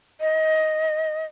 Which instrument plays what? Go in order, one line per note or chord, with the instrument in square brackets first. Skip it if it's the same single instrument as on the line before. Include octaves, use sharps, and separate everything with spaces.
[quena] D#5